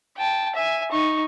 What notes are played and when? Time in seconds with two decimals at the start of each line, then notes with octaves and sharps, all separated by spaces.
0.17 G5 A5
0.55 E5 G#5
0.92 D#4 C#6